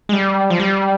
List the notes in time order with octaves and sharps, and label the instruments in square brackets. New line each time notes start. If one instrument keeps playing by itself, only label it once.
[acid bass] G#3
G3
F3
G3